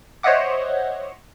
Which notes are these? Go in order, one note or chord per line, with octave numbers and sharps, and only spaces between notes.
C5 C#5 D#5 E5 F#5 D6